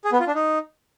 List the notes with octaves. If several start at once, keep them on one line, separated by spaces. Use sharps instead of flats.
G#4
B3
F4
D4
D#4